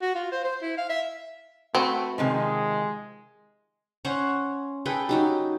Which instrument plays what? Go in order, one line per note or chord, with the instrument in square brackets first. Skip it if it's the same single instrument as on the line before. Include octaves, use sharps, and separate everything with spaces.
[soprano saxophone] F#4
F4
C5
C5
E4
F5
E5
[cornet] A3 [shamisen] C4 [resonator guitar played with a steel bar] F#4 B4
[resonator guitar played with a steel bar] C3 D#3 F3 [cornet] G#3
[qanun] C#4 C5 C#5 F#5
G#4 A4 B4 G5
F#3 D#4 G4